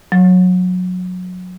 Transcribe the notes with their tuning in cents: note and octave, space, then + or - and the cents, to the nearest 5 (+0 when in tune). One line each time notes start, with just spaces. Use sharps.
F#3 -25